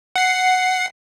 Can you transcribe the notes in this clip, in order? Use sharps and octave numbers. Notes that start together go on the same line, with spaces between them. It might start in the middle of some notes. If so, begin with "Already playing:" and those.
F#5 C7